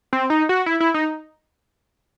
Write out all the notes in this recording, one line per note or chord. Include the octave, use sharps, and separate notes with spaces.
C4
D#4
F#4
E4
E4
D#4